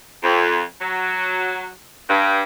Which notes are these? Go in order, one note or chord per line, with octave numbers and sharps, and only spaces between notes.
F2
F#3
G2